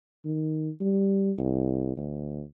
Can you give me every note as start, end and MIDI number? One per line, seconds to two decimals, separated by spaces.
0.25 0.70 51
0.80 1.32 55
1.38 1.95 36
1.97 2.44 38